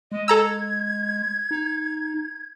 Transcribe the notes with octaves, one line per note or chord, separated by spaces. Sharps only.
G#3 D#5
A4 A#5 E6 G#6
D#4